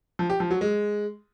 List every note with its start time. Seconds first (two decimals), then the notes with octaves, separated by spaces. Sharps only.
0.19 F3
0.30 G4
0.40 F3
0.51 F#3
0.61 G#3